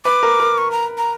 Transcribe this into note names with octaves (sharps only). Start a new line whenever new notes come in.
B4 D6
A#4
A#4
C#6
A#5
A#5